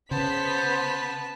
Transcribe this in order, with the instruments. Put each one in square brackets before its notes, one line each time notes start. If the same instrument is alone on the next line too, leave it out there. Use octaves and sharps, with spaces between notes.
[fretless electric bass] C#3 [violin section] B3 B6 [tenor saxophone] C5 [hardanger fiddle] A5